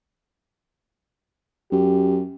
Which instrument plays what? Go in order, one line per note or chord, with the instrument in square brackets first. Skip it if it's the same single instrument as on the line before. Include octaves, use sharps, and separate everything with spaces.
[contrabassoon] F#2 [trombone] G4